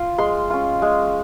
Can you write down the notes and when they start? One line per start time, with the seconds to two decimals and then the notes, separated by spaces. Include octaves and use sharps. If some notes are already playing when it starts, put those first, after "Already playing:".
Already playing: F4
0.18 G#3 C6
0.50 C#4 F4
0.82 G#3